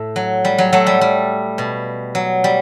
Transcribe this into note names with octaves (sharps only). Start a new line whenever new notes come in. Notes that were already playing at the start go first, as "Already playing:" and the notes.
Already playing: A2 A3
F#3
G3
F#3
F#3 A3
G3
G3
B2
F#3
G3